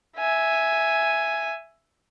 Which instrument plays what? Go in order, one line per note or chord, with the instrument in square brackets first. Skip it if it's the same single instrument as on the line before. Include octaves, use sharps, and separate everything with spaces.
[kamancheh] E5 G#5